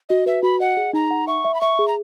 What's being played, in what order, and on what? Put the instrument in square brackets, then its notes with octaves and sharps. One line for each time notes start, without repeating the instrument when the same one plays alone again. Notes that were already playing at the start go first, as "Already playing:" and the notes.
[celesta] F#4 [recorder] D#5
[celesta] B4 [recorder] E5
[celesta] F#4 [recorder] B5
[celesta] D#5 [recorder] F#5
[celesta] G#4
[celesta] D#4 [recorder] A#5
[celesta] F#5
[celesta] E5 [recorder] C#6
[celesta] E5
[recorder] B5
[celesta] E5 [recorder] C#6
[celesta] G#4
[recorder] A#5